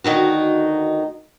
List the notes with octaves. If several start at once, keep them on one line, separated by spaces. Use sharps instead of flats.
D2 D#3 D#4 F#4